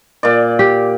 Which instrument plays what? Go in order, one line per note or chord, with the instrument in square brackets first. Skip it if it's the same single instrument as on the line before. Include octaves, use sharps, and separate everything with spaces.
[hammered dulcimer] A#2 D5
[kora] G4